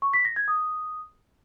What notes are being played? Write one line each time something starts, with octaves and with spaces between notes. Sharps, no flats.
C#6
B6
A#6
G#6
D#6